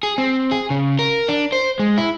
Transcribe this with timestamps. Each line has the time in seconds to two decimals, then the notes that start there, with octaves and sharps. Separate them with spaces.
0.03 G#4
0.18 C4
0.51 G#4
0.70 C#3
0.99 A#4
1.28 D4
1.52 C5
1.80 G#3
1.98 E4